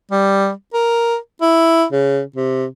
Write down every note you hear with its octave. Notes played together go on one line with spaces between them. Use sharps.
G3
A#4
E4
C#3
C3